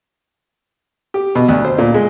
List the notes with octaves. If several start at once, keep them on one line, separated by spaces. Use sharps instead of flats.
G4
B2
D2
C5
A#2
G#3